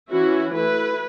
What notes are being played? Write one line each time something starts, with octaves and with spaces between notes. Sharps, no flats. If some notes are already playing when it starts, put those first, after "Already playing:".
E3 C#4 E4 F#4
A3 B4
E4